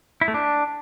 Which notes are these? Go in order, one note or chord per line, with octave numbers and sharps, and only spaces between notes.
E4
A3
D4